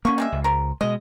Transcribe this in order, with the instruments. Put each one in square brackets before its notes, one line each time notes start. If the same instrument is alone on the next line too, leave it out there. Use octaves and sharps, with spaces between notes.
[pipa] D3 C#6 [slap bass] A#3 C#4
[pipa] G3 G#3 E5
[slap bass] C#2
[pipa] A#4 C5
[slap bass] B2 G#3 [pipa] D#5